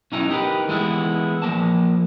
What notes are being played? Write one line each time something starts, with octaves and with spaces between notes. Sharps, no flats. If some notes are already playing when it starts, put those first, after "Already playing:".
B1 C#4 D#4 E4 A#5
D#4 G4 A#4 B4
E3 G#3 A3 B3 E4
F3 A#3 A5